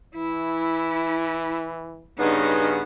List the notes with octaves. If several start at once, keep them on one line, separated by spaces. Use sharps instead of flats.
E3 E4
G2 C#3 B3 C#4 D#4